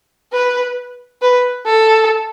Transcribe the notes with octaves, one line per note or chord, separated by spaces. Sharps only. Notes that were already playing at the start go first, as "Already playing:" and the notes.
B4
B4
A4